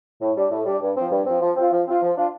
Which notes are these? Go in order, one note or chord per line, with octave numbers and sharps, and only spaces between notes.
A2
G3 D4
A2
G3 D4
G2
F3 C4
G2
F3 C4
F3
C4 F4
F3
C4 F4
F3
D4 F4